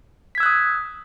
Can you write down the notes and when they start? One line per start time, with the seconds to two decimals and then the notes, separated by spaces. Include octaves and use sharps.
0.35 B6
0.38 G#6
0.40 E6
0.43 F#6
0.46 D#6